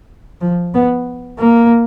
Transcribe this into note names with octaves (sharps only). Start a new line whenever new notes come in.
F3
B3
A#3